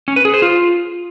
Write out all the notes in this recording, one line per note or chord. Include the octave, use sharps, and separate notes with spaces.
C#4
B4
G#4
C5
F4